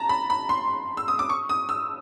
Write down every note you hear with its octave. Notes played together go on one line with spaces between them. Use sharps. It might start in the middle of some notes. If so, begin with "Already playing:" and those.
Already playing: A5 A#5
B5
B5
C6
E6
D#6
D6
C#6
D#6
E6